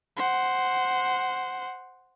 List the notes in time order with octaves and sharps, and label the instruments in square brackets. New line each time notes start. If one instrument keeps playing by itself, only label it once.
[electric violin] C5 F#5